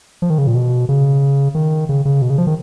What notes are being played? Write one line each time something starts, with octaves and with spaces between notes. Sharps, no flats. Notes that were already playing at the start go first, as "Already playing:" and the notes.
F3
D#3
C#3
A#2
B2
C#3
D#3
C#3
C#3
B2
C#3
F3
D#3